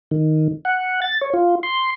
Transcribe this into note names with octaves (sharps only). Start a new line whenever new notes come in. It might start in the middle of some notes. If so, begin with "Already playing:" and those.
D#3
F#5
A6
C#5
F4
C6